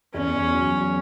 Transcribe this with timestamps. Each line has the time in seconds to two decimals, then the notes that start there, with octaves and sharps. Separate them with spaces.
0.14 E2 C#4
0.34 E2
0.52 F#3
0.72 F#3